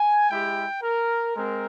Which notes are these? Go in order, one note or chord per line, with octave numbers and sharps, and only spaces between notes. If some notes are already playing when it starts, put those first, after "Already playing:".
Already playing: G#5
G#3 E4 G4 G5
A#4
G#3 C4 A#4